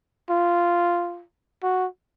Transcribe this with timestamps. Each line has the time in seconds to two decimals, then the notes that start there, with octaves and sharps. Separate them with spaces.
0.30 F4
1.63 F#4